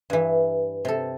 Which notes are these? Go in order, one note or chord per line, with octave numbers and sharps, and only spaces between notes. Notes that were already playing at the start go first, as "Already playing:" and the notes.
G2 E3
C3 A4